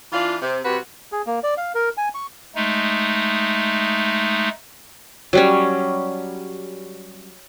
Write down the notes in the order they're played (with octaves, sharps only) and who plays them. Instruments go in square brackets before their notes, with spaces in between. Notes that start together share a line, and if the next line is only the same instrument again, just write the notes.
[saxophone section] E3 D4 F4
C3
C3 G3 F#4 B4
[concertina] G#4
A#3
D5
F5
A#4
G#5
C#6
[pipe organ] G#3 A3 D#4
[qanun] F#3 G3 C#4